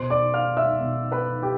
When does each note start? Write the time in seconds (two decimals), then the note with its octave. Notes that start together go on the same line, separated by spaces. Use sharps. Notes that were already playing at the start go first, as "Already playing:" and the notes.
Already playing: B2 C5 C6
0.10 D5 D6
0.34 F5 F6
0.57 E5 E6
0.80 B2
1.12 B4 B5
1.43 G4 G5